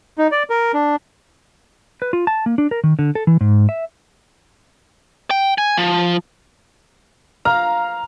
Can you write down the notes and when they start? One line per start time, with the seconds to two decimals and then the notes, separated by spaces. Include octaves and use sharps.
0.18 D#4
0.32 D5
0.50 A#4
0.74 D4
2.02 B4
2.13 F4
2.27 A5
2.46 A#3
2.58 D4
2.71 A#4
2.84 D#3
2.99 D3
3.15 A4
3.27 E3
3.41 G#2
3.69 E5
5.31 G5
5.58 G#5
5.77 F3
7.45 F5 A#5